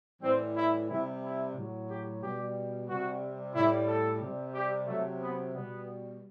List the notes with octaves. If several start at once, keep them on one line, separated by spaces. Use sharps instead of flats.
A2 E3 G3 C4
E4
C3 G3 E4
E4
A2 F#3
G4
B2 G3 G4
C3 G3 F#4
A2 G3 E4
A4
C3 G3
G4
C3 F#3 A3
B3
B2 G3 B3